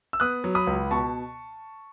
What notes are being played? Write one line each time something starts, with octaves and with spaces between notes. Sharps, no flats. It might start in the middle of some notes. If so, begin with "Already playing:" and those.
E6
B3 D#6 F#6
F#3
B5 D#6
C#2
B2 A5 C#6